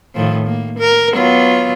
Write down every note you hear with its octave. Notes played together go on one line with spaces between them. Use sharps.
A2 D#3 F3
A#3
A#4
F#3 B3 F4